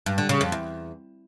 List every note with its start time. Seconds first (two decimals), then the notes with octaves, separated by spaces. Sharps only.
0.06 G2
0.18 D3
0.29 C#3
0.41 F2
0.52 E2